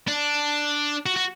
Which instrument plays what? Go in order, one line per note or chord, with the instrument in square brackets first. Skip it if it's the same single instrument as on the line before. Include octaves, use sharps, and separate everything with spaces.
[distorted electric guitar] D4
F#4
F#4